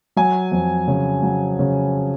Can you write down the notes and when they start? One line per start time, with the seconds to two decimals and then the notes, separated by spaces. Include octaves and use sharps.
0.16 F#3 G#5
0.52 F2
0.88 C#3
1.23 F#3
1.59 C#3